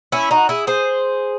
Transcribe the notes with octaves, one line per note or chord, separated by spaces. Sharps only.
C#4 E4
D#4 F#4
E4 G#4
G#4 C5